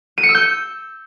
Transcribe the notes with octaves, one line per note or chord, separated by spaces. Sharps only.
D#7
C#7
E6
G6